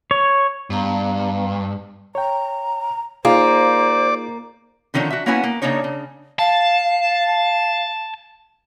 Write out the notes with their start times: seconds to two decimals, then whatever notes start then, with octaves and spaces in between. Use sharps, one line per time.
0.11 C#5
0.70 G2 B3 F5 A#5
2.15 C#5 G5 A#5
3.25 A#3 D#4 F4 G#4 C5 D5
4.94 D3 D#3 F3 C#4 D4
5.10 F#4 E5
5.26 A#3 B3 C#4 E4 F#4 G#5
5.44 A#3
5.62 C#3 A#3 D4 D#4 C#5
5.84 C#3
6.39 F5 A5